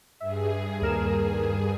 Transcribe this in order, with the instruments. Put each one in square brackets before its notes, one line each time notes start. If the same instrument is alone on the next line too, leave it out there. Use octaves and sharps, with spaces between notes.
[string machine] G2 G#4 [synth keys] E5
[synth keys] D#2 A#4 E7